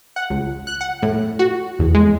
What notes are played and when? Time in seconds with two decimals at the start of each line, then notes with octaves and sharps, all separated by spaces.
0.16 F#5
0.30 C#2
0.67 F#6
0.81 F#5
1.02 A2
1.39 F#4
1.79 E2
1.95 G#3